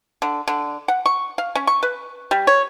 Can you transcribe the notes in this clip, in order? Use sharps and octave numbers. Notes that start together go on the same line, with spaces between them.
D3
D3
F#5
C#6
F5
C#4
C#6
B4
G3
C#5